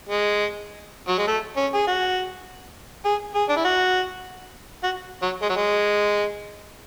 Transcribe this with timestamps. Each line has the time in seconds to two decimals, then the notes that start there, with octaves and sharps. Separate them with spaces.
0.09 G#3
1.08 F#3
1.18 G#3
1.27 A3
1.57 C#4
1.74 G#4
1.87 F#4
3.05 G#4
3.35 G#4
3.49 D4
3.56 E4
3.65 F#4
4.83 F#4
5.22 F#3
5.42 G#3
5.49 F#3
5.56 G#3